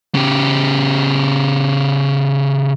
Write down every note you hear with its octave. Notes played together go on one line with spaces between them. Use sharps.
C#3 G4